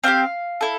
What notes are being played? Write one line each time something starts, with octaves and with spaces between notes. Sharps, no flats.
C4 E4 G4 F5
E4 A4